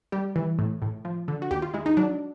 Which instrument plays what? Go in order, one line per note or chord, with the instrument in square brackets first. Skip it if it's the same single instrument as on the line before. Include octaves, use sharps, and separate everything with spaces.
[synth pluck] G3 G4
E3
A2
A2
F3
D3
F#4
D#2 G4
F4
G#3 E4
D#4
F#3 D4